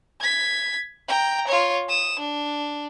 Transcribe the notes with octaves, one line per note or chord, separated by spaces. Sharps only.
G#6 B6
G5 A#5
F4 C#5
D#6 E7
D4